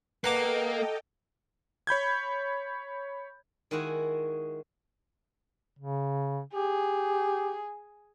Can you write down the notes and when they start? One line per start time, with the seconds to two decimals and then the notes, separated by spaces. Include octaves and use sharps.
0.24 A#3 A4 B4 D#5 F#5 G5 A#5 D6
1.87 C#5 B5 G6 G#6
3.71 D#3 G#3 E4 F#4 G#4
5.79 C#3
6.54 G4 G#4